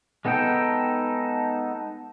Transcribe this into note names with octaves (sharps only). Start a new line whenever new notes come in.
G#3 B3 D#4 A4 G5